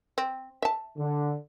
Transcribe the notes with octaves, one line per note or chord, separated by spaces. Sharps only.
C4
E5 A5
D3